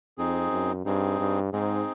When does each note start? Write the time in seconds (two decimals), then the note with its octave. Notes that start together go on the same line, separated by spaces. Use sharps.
0.18 F2 C4 D#4 G#4
0.52 F#2
0.85 G2 C4 D#4 G#4
1.20 G2
1.53 G#2 C4 D#4 G#4